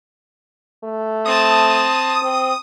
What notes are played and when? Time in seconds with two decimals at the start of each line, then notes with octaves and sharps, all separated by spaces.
0.84 A3
1.26 C4 A5 D#6
2.23 C4